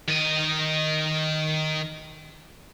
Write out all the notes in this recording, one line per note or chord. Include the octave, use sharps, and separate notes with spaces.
D#3 D#5